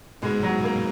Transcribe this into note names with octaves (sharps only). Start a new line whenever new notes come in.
G#2 B2 G#3
F#3
A#3